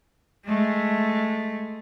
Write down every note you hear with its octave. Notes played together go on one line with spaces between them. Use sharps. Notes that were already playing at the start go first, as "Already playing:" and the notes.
G#3 A3